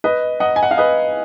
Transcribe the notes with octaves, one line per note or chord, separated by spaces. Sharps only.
B4 D#5
D#5 F#5
G#5
F#5
F5
B4 D#5